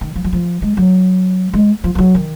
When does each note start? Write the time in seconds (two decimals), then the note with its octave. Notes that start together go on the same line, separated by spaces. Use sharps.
0.01 D#3
0.16 F3
0.24 F#3
0.33 F3
0.62 G#3
0.77 F#3
1.53 G#3
1.84 F3
1.95 F3
1.98 F#3
2.15 D#3